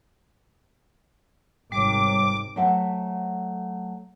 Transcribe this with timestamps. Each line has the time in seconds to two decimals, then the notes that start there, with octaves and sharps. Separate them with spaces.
1.72 G#1 C3 G3 C#5 D6
2.56 F#3 A3 C5 E5 F#5